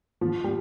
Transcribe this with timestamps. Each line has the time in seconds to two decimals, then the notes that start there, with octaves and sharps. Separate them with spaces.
0.21 F3
0.44 G3